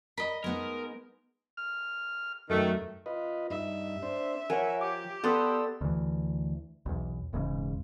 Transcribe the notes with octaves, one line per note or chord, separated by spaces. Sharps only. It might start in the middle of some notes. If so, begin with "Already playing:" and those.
A#4 D#5 B5
G#3 B3 D#4 A#4
F6
F#2 D#3 A3
F4 B4 D#5
G2 D#4 E5
D4 C5
F3 A#4 C#5 F#5 G#5
G4 D6
B3 A4 B4 D5 C6 D#6 E6
D2 E3
B1 E2
E1 E2 G#2 C#3